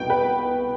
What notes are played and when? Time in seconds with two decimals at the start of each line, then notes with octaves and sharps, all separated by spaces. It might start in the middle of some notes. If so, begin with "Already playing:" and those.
Already playing: C2 B2 B3 G5
0.10 B4